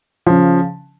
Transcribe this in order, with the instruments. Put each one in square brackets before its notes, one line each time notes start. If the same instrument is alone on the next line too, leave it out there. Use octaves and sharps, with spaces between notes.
[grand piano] C#3 F3